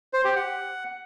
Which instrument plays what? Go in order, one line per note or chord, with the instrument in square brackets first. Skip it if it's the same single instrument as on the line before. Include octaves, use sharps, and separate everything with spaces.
[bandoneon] C5
G4
F#5